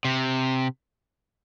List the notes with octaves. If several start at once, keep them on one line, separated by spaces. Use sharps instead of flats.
C3